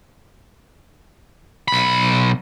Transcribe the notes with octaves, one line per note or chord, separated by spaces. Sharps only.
B1 B5